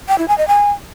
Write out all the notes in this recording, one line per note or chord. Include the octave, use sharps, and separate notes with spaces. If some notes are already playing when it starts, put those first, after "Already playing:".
G5
E4
G#5
D#5
G#5